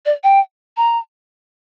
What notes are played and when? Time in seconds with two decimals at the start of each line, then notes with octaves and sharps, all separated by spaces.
0.05 D5
0.23 G5
0.77 A#5